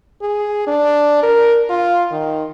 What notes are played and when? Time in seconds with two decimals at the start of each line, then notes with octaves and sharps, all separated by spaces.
0.21 G#4
0.67 D4
1.23 A#4
1.70 F4
2.11 D#3